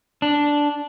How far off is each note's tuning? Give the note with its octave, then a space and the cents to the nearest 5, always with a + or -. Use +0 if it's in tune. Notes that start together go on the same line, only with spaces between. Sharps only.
D4 -5